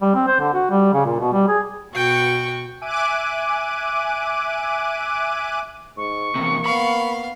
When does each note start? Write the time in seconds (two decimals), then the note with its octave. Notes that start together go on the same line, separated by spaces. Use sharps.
0.02 G3
0.15 C4
0.27 C5
0.40 D3
0.53 F#4
0.70 G3
0.93 C#3
1.05 A#2
1.20 B2
1.32 G3
1.48 G#4
1.95 B2 F#4 G5 C#6
2.81 E5 G#5 D6 F#6 D#7
5.97 G#2 C#6
6.35 E2 C3 A#3
6.66 B3 F5 B5